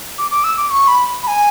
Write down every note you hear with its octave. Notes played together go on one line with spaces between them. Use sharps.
D6
D6
E6
D6
C#6
B5
B5
G#5